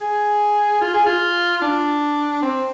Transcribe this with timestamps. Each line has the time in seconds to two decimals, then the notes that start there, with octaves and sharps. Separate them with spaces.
0.01 G#4
0.81 F4
0.94 G#4
1.06 F4
1.62 D4
2.42 C4